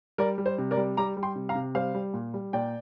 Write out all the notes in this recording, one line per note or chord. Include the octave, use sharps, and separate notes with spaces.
G3 A#4 D5
G3
C5
C3
A#4 D5
G3
G3 A#5 D6
G3
G5 C6
C3
F5 A#5
C3
G3 C5 F5
G3
A#2
G3
A#2 D5 G5